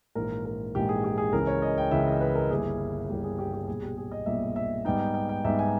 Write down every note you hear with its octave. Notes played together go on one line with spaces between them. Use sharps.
A#1 G#2 E3 A#4
A#4
A#1 G#2 E3 G4
G#4
G4
G#4
C#2 C#3 E3 A#4
C#5
D#5
G5
C#2 C#3 E3 E5
D#5
B4
A#4
G1 G2 G3 A#3 E4 G#4
G1 G2 G3 A#3 E4 G4
G#4
G4
G4
B1 A#2 G3 G#4
G4
G#4
D#5
B1 A#2 G3 E5
E5
G#2 G3 B3 D#4 G5
G5
G5
G5
G#2 G3 B3 D#4 E5
G#5